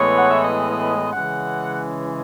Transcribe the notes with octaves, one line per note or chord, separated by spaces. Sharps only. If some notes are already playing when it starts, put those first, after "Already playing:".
Already playing: A2 E3 G#3 B3 C#5
F#5
E5
D#5
C#3 E3 G#3 C#4 F#5